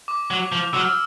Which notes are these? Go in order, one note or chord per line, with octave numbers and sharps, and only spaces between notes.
D6
F#3
F3
F#3 E6
F6
E6